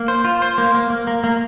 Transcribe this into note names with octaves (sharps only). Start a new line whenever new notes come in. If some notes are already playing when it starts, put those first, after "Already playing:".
Already playing: A#3
C5
F4
C5
A#3
A#3
A#3
A#3
A#3